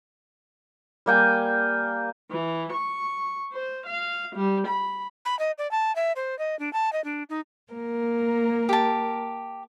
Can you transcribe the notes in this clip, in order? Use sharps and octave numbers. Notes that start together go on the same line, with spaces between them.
G3 A#3 G5 G#5
E3
C#6
C5
F5
G3
B5
B5
D#5
D5
A5
E5
C5
D#5
D4
A5
D#5
D4
D#4
A#3 A#4
G4 A5